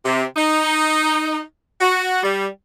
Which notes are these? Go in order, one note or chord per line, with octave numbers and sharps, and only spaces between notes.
C3
D#4
F#4
G3